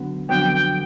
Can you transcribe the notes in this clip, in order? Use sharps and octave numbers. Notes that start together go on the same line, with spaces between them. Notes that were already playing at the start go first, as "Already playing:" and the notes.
Already playing: D3 F#3 B3
F2 D3 F#3 B3 G5
G5